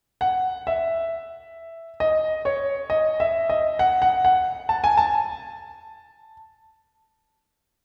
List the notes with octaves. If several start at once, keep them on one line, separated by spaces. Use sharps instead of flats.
F#5
E5
D#5
C#5
D#5
E5
D#5
F#5
F#5
F#5
A5
G#5
A5